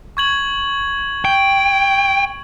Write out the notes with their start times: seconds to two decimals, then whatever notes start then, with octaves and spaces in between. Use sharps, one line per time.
0.17 C#6 G#6 F#7
1.25 G5